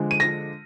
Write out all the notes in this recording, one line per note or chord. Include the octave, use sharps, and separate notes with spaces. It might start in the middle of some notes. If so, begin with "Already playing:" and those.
Already playing: D3 F3 G#3
D#7
A#6